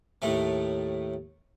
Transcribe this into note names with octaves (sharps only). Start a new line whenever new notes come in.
D#2 A2 A3